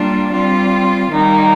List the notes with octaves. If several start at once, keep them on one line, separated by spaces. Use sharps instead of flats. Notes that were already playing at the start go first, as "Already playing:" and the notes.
Already playing: G3 A#3 D4 F4
G3 C4 F4
D#3 G3 A#3 D#4